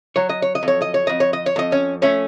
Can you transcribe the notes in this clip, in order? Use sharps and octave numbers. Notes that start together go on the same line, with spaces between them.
F#3 C#5
D#5
C#5
D#5
F2
C#5
D#5
C#5
F2 D#5
C#5
D#5
C#5
F2 D#5
C#4 C#5
A3 C#4 C#5